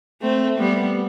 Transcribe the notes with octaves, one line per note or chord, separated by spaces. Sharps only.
A3 C4
G3 B3